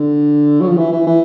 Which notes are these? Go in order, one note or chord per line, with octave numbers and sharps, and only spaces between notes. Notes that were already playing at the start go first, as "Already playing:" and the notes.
Already playing: D3
F#3
F3
E3
E3
E3